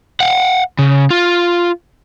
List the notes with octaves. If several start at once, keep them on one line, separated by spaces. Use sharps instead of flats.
F5 F#5
C#3
F4